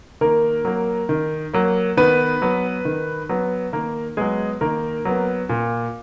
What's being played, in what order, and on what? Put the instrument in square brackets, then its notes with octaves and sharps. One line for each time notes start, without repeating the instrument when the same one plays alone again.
[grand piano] D#3 A#3 A#4
F#3 A#3
D#3
F#3 A#3
D#3 B3 B4
F#3 B3
D#3
F#3 B3
D#3 A#3 A#4
F#3 G#3 B3 G#4
D#3 A#3 A#4
F#3 B3
A#2